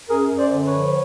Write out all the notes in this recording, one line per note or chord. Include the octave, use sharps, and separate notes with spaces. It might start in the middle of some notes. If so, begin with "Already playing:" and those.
F#2 G#4 A#4
F#2
C5 D5
D3
B4 C#5
F3